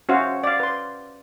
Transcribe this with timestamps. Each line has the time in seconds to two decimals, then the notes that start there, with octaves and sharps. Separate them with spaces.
0.09 C#4 F#4 C5 E5 F5
0.44 D5 F5
0.60 B4 C6